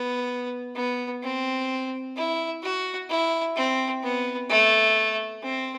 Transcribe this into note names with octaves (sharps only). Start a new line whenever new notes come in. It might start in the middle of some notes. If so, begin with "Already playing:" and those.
Already playing: B3
B3
C4
E4
F#4
E4
C4
B3
A3
C4